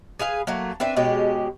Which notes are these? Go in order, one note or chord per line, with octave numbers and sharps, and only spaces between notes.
G#4 B4 F5 G#5
F#3 A3 A#3
C4 D4 B4 E5
B2 G#3 C#4 G4